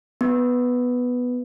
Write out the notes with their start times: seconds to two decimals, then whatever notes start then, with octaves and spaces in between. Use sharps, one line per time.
0.21 B3